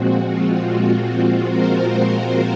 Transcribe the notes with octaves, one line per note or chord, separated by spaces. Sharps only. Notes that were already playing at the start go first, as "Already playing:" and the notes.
Already playing: A#2 F3 G#3 C4 F#4
F4
F#4
A#4 C5